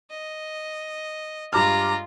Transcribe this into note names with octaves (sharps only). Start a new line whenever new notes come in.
D#5
G2 G#3 F4 A#5 D6 F6